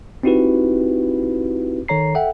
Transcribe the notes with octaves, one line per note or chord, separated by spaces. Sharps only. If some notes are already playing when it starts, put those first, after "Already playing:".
C4 D#4 E4 F#4 G4 B4
D#3 A4 C#5 A#5 C7
A4 E5 F#5 G5